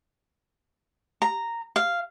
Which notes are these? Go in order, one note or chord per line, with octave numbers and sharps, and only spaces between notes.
A#5
F5